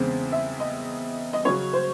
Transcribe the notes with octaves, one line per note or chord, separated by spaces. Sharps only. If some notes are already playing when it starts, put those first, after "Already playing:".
Already playing: E2 C#3 G#3 C4
E5
D#5
D#5
C#3 F#3 C#4 C#5
C5